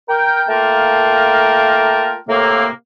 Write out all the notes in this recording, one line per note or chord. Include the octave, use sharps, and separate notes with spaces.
A#4 G5
A3 A#3 F4 A#4 G5 A5
A2 C3 A3 A#3